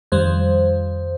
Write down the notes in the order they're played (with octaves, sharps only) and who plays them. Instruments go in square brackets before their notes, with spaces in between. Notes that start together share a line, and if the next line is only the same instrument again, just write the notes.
[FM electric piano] F2 D#3 G3 C5